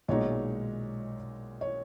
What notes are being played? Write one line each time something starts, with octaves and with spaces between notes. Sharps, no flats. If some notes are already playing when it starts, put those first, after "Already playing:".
B1 A#2 G#3 D#4 C#5
C#5